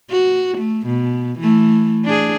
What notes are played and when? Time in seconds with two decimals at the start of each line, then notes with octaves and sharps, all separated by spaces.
0.10 F#4
0.58 A3
0.87 B2
1.39 E3 A3
2.05 D4 G#4